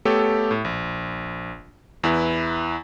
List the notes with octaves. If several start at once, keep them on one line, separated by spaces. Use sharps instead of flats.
A3 B3 G4 A4 C#5
A2
A#1
E2 E4 B4